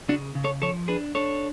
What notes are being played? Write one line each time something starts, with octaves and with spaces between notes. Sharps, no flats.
C#3 D4 F#4
C#3
A4 C#5
F3 A4 C#5
D4 G#4 B4
D4 A4 C#5